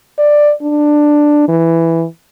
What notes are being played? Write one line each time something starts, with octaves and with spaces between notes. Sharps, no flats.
D5
D4
E3